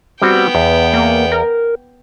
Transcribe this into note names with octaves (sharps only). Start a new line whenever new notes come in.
G3 B3 C4 F#4 G5
E2
A#3
A#4